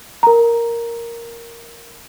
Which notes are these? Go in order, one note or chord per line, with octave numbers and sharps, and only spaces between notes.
A#4 A#5